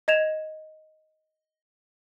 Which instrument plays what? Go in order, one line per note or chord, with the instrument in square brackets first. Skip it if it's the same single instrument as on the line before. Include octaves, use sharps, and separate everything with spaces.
[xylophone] D#5 G#6 E7 F7